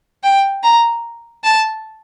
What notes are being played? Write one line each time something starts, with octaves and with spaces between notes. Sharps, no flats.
G5
A#5
A5